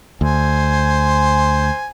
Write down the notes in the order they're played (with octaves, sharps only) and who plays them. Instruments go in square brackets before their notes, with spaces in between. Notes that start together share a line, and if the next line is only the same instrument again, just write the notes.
[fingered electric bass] D2 [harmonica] C5 G#5